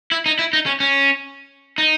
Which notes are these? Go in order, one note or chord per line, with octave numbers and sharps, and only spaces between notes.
E4
D#4
E4
D#4
C#4
C#4
D#4